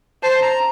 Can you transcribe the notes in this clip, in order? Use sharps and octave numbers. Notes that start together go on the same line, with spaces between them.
C5 A5
A#5